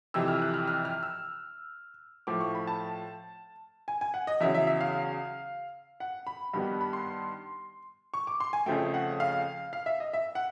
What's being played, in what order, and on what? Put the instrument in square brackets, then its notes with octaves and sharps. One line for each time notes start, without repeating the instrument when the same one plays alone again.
[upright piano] F2 C3 E3 E6
F6
F#6
F6
F6
F6
E6
A2 F3 A3 D6
C#6
B5
A5
G#5
G#5
F#5
D#5
E2 C#3 F#3 E5
E5
E5
F5
F#5
B5
G2 D#3 G3 B3 B5
B5
B5
C6
C#6
D6
C6
G#5
F2 C#3 F3 A3 G5
F#5
F5
F5
E5
D#5
E5
F#5